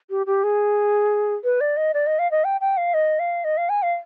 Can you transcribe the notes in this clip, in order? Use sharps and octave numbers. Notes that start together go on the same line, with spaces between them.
G4
G4
G#4
B4
D5
D#5
D5
D#5
F5
D#5
G5
G5
F5
D#5
F5
D#5
F5
G#5
F5